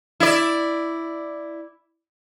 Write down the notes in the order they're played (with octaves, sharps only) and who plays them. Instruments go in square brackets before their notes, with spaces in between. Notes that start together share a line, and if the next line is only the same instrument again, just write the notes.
[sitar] E4 D5